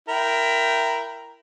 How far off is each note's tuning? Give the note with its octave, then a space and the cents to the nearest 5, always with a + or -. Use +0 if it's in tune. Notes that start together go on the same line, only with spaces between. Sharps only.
E4 +20 A#4 +0 G5 -10